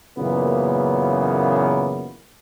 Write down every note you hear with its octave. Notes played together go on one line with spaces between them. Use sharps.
F#2 A#2 C#3 E3 A#3 B3